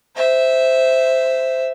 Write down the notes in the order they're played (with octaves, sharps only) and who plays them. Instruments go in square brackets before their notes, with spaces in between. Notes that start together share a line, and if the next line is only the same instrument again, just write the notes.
[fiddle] C5 E5